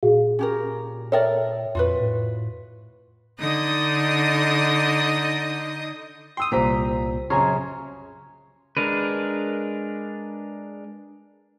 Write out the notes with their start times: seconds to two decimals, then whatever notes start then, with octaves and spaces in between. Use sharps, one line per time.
0.03 A#2 F#4 G#4 F5
0.39 C#4 G4 A#4
1.12 A4 A#4 C#5 D5 E5 G5
1.75 F2 F4 F#4 B4
2.00 A2
3.39 D3 D#4 D#5 D#6
6.37 G5 C6 D#6 E6
6.52 C2 A#2 G4 C5 A#5 B6
7.30 F#2 C#3 C#5 G#5 A#5 C6
8.77 G#3 D4 A#4 B4